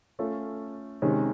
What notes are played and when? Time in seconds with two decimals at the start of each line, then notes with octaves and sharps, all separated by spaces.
0.19 A3 C#4 F4 A4
1.02 C3 D#3 G#3 C#4